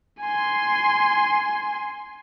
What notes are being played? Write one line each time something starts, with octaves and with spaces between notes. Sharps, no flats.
G#5 C6